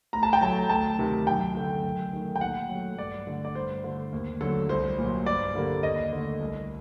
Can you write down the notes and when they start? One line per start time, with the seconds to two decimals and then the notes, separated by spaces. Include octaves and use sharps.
0.13 A2 A#5
0.23 A5
0.33 G5
0.41 F#3 A3 A5
0.69 D2 A5
0.99 C3 D#3
1.27 F#2 G5
1.55 D3 A3
1.84 F#2
2.13 D#3 A3
2.36 G5
2.41 A#2 F#5
2.70 F#3 A3
2.98 G2 D5
3.27 D3 A3
3.45 D5
3.55 G2 C5
3.84 D3 A3
4.12 D#2
4.41 D3 F#3 A3 A4
4.69 C2 C5
4.98 A#2 F#3
5.26 G2 D5
5.55 D3 G3 A#3
5.83 D#2 D#5
6.13 D3 A3
6.40 C2